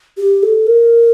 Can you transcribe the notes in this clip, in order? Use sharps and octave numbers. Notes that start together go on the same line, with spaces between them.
G4
A4
A#4